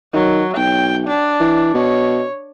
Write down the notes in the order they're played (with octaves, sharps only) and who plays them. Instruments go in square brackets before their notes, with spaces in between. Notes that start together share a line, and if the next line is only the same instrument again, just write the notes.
[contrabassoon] D#3 [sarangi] F#3
[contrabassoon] B1 [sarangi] G5
[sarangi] D4
[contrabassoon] E3
[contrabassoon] B2 [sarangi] C#5